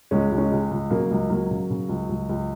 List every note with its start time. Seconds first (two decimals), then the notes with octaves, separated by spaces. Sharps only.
0.11 C#2 G#3 C#4
0.32 C#2
0.38 G#3 C#4
0.52 C#2
0.71 C#2
0.90 C#3 F#3 A#3
1.11 C#2
1.30 C#2 F#3 A#3
1.50 C#3
1.70 C#3
1.89 C#2
2.09 C#2
2.29 C#2